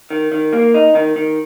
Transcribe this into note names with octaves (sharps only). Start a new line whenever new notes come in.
D#3
D#3
A#3
D#4
D#3
D#3